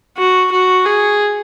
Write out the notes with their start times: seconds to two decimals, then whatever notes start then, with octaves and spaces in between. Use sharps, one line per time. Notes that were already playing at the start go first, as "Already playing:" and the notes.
0.17 F#4
0.51 F#4
0.85 G#4